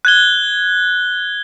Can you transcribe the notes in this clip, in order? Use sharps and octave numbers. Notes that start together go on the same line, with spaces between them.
F#6 G#6 G7